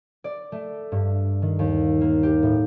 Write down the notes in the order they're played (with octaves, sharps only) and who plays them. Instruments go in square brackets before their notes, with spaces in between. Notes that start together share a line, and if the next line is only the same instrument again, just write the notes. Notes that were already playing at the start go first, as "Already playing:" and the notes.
[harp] D5
A3
G2
D#3
D#2
A#3
G4
A2